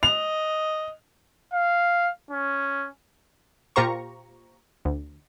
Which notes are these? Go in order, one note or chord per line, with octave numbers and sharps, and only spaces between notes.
D#5 F7
F5
C#4
A#2 F4 G4 C5 A#5 C#6
D2